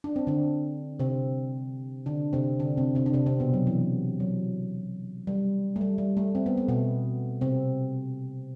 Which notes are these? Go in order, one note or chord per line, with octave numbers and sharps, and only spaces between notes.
D4
C4
D3 D4
C3 C4
D3 D4
C3 C4
D3 D4
C3 C4
C3 C4
D4
C3 C4
C3 C4
B2 B3
F#3
E3
F#3
G3
A3
G3
G3
A3
C4
B3
A3
B2 B3
C3 C4